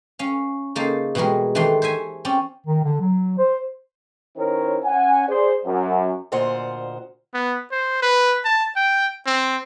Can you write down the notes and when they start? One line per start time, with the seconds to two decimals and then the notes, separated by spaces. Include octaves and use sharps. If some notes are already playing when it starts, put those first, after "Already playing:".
0.19 C#4 F5
0.75 C#3 A#3 D#4 C5 A5
1.15 B2 E3 G3 G#3 A#4
1.55 D#3 E3 A3 D4 G4 C6
1.82 C5 C#5 E5 G#5
2.25 C4 C#4 D5
2.66 D#3
2.83 D3
3.00 F#3
3.38 C5
4.37 D#3 C#4 E4 A#4 C5 C#5
4.83 C#4 F#5 G#5
5.28 G#4 C5 D5
5.65 F#2
6.32 D2 A#2 F4 C5 D#5 F#5
7.34 B3
7.71 C5
8.02 B4
8.44 A5
8.76 G5
9.26 C4